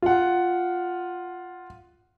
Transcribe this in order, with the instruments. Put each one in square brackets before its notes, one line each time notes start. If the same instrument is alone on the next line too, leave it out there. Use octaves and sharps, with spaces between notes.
[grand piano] F4 F#5